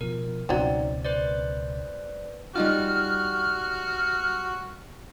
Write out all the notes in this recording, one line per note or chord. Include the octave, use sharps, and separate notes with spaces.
B2 F3 A#4
C#2 B2 F#3 C4 C#4 D#4 D5
B4 C5 D5
G3 D#4 F4 F#4 F6